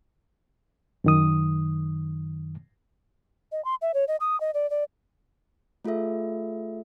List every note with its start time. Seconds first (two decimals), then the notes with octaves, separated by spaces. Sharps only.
1.04 F#2 D#3 D#6
3.52 D#5
3.65 C6
3.82 E5
3.94 C#5
4.08 D#5
4.20 D#6
4.41 D#5
4.54 D5
4.70 D5
5.85 A3 F4 G#4 A4 E5